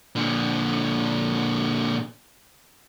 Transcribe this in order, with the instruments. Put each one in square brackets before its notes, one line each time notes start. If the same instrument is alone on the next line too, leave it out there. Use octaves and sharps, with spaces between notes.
[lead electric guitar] A#2 D3